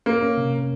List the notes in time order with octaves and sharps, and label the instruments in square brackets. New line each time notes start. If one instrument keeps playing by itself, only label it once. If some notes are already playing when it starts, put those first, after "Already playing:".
[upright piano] A#3 [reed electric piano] C#4
[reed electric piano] C#4
C3